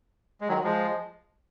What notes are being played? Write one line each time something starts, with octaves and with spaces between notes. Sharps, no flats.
G#3
D#3 F#3
F3 G#3